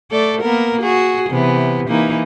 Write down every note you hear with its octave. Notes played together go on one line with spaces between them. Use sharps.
A3 A4 D5
A#3 B3 A#4
F#4 G#4
C3 E3 B3
E3 A#3 D#4